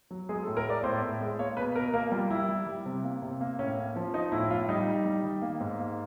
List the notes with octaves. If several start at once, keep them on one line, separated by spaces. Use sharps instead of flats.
F#3
G#3 G#4
A4
A2
A#4
G#3 D5
A2 C5
A2
G#3
A#3 C#5
B2 B4
B2 A#4
A#3 A#4
G3 F4
G3 E4
G3
G3
C3
A#3
C3
A#3
A2 C#4
A#3
F3
F3 D#4
A2 E4
A2 F4
G3 D#4
G3
G3
D#3
A#3
G#2
A#3